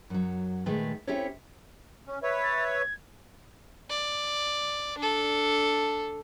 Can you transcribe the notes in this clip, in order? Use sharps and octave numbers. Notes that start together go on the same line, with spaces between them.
F#2 F#3
A#2 D#3 G#3 A3 G#4 B4
C4 C#4 E4 G4 A4 C#5
C#4
B4 C#5 E5
A6
G#6
D5
D4 A4